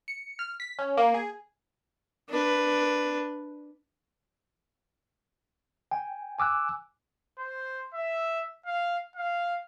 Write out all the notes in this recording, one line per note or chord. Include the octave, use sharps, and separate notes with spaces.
C#7
F6
B6
C#4
A#3
G#4
D4 B4
G5 G#5
G#5 D6 E6 F#6
C5
E5
F5
F5